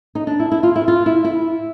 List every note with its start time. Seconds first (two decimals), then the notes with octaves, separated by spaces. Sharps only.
0.15 D#4
0.27 D4
0.40 E4
0.52 E4
0.63 F4
0.76 E4
0.88 F4
1.06 E4
1.24 E4